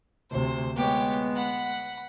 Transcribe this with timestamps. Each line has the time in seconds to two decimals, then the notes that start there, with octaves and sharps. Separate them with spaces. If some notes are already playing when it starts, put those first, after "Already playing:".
0.31 D2 C3 C5
0.76 G#3 B3 G4 C#5
1.36 F#5 B5